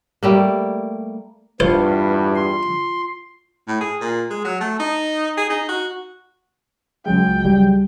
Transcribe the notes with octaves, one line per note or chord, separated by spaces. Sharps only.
G3 A3 A#3
E2 G2 B3 F4 C5 C#6
C6
A2
G#4
A#2
G#3
F#3
A3
D#4
G#4
D#4
F#4
C#2 F#3 G#3 G5
G3